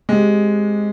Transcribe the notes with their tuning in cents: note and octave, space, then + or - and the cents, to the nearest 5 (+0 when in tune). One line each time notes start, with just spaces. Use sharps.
G#3 +0 C4 +0 G4 -5